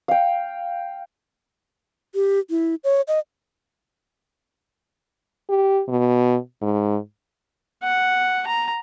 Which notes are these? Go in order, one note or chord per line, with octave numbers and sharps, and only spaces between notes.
F5 G5
G4
E4
C#5
D#5
G4
B2
G#2
F#5
A#5